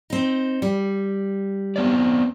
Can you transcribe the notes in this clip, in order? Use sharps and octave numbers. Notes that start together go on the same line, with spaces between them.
C4 D#4
G3
B3 C4 D5